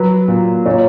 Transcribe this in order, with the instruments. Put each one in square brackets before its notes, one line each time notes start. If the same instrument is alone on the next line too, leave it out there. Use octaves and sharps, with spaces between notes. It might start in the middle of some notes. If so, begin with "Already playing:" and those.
Already playing: [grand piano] F#3 [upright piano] B4
[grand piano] A#2
[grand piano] A#2 [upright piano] C#5